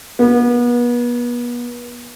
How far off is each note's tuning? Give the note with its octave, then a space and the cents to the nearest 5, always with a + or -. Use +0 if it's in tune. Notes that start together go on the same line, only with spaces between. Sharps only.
B3 -35